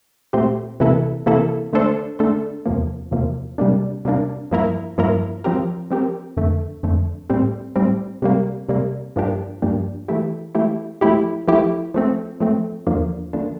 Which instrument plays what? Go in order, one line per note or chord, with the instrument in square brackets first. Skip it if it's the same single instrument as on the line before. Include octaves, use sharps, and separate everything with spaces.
[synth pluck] A#2 A3 C4 G4 C5
C3 E3 A#3 E4 A4
C3 E3 A#3 E4 A4
D3 A3 D4 A4 C5
D3 A3 D4 A4 C5
E2 C3 F3 A#3
E2 C3 F3 A#3
C3 G3 A#3 D4
C3 G3 A#3 D4
G2 F3 A#3 E4 A#4
G2 F3 A#3 E4 A#4
F3 C4 G4 A#4
F3 C4 G4 A#4
F2 D3 A3
F2 D3 A3
A2 G3 C4
A2 G3 C4
C3 G3 A#3
C3 G3 A#3
G2 F3 A#3 D4 G4
G2 F3 A#3 D4 G4
E3 A3 E4 G4
E3 A3 E4 G4
F3 A3 E4 G4
F3 A3 E4 G4
F3 A3 C4
F3 A3 C4
E2 D3 F3 A#3 D4
D3 F3 A#3 D4